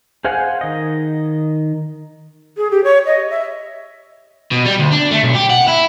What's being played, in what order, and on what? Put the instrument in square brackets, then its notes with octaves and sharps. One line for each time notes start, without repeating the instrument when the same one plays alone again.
[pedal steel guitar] G#4 C5 F5 F#5 G#5
D#3 D#5
[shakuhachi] G#4
G4
C#5
D#5
E5
[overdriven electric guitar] B2
G3
D2
D4
A3
B1
G4
F#5
E4